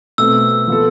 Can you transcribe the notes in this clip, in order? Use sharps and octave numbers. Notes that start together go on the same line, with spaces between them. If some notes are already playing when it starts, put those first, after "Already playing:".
B2 A3 C4 E6
F3 B3 F4 A4